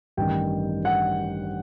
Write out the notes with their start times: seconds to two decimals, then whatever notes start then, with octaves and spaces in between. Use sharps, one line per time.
0.17 A1 G2 D#3 G5
0.85 F#5